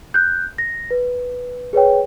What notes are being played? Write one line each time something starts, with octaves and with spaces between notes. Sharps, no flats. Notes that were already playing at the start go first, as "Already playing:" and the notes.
F#6 G6
A#6
B4
G#4 B4 C#5 G5